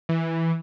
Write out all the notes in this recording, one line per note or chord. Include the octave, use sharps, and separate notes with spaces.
E3